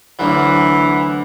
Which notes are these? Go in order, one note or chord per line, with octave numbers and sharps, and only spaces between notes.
D2 D3 E3 F#3